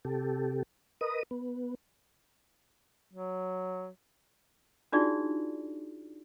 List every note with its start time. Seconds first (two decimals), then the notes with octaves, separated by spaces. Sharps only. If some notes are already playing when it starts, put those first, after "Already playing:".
0.05 C3 G4 A4
1.01 A#4 B4 D#5 D#6
1.31 B3
3.14 F#3
4.92 D4 D#4 F4 F#4 G#4 D5